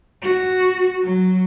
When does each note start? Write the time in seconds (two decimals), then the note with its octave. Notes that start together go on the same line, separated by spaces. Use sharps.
0.22 F#4
1.03 F#3